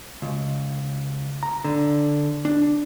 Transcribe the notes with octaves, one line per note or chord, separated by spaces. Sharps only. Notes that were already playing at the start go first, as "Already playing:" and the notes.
C#2
A#5
D3
D4